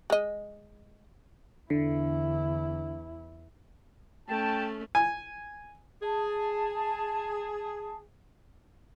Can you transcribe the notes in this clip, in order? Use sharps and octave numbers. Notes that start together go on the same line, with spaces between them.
G#3 D#5
E2 D3 E4
A3 C#4 G5 A5
G#5
G#4 A5